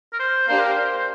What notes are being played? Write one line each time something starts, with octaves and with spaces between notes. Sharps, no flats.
A#4
C5
A#3 D4 G4 C5
A#4
C5
C5